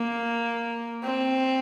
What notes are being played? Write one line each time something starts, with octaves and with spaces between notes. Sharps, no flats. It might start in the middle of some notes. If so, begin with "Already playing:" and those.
Already playing: A#3
C4